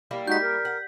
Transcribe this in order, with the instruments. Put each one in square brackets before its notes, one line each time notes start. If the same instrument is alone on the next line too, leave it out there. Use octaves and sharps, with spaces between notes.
[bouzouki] G3 A#3 E4
[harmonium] G#3 D#4 F#4 [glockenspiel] G6 B6
[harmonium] A#4
[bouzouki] F#5